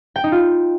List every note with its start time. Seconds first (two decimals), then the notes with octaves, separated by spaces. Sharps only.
0.16 G5
0.24 D#4
0.32 F4